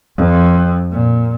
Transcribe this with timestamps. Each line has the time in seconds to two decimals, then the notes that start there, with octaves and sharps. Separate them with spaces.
0.17 F2
0.92 A#2